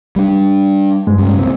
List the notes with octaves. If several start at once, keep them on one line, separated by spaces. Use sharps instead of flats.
G3 A3 D4
G2 G#3
F#2 C#3
C#2 A#2 C4